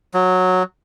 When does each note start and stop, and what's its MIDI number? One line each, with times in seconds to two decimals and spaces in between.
0.14 0.63 54